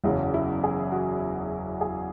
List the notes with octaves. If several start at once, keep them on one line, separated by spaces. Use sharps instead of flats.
F#1 E2 C#3 F#3 E4
E4
G#4
F#4
G#4